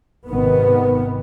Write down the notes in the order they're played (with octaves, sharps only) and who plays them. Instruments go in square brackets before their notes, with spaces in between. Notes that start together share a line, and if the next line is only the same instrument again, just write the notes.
[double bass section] G#1 C3 D#3 B3